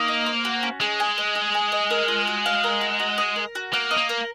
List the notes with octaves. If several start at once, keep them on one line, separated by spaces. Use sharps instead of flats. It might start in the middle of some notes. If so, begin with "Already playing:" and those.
Already playing: A#3 D#4
D#5
C5
F#4
C#4
G#3 G#4
G#5
D#5
G#4
G#5
D#5
A#4
F4
F#4
F5
A#4
F#4
F#4
D#5
A#4
F#4
A#3 F#5
D#5
A#3
A#4